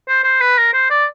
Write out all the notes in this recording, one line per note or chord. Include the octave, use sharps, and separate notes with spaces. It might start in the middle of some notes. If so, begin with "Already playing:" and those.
C5
C5
B4
A#4
C5
D5